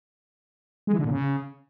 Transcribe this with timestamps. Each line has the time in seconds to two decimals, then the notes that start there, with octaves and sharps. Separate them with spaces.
0.87 G#3
0.93 E3
0.99 D3
1.05 A#2
1.10 C#3